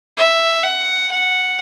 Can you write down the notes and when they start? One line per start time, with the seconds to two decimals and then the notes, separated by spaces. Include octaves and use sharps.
0.18 E5
0.64 F#5
1.11 F#5